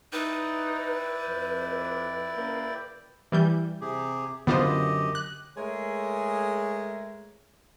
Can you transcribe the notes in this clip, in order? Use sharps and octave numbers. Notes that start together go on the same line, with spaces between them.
D#4 E4 B4 D5 G5
F2
C#3 A#3
E3 G3 G6
C3 G4 G#4
F#2 D3 B3 F4 G4 C5 D#5
F#6
G#3 A3 G#4 A#4 C#5 E5